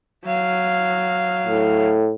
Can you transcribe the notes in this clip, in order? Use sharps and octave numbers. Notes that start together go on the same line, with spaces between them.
F#3 F5
A2